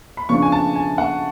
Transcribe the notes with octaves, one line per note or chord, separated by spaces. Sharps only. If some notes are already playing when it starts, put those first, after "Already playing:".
B5
C#3 F3 B3 D4 C#6
G#5
A5
G#5
F#5